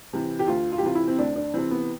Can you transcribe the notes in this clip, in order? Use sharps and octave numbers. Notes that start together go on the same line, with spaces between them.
C3 E3
G4
D2 F4
F4
G4
C3 E3 F4
E4
C4
D2 D4
D4
C3 E3 C4
B3